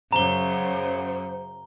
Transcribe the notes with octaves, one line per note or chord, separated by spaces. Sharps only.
F#2 C#3 C5 A#5 G7